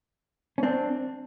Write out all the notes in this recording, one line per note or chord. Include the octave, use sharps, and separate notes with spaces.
C#4
C4 D4